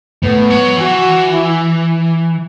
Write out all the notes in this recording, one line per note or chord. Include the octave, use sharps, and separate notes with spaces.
A2 B3
F#3
E3 F#4
E4